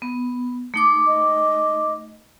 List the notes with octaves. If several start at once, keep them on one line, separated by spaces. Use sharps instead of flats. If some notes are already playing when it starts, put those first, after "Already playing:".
B3
A3 D#4 D6
D#5